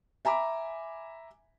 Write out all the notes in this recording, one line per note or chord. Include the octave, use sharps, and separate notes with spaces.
E5 G#5 A#5 B5 D6